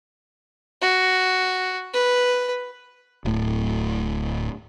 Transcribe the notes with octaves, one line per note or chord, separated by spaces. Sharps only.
F#4
B4
D1 A2